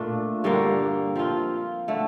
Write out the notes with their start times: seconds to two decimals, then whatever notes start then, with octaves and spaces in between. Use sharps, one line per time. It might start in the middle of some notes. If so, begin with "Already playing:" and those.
Already playing: A#2 A3 D4 F4
0.44 G2 D3 G3 A#3
1.16 F3 C4 F4
1.88 D3 A3